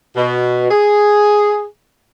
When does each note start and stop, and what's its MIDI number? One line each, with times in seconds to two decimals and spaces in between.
0.16 0.66 47
0.71 1.65 68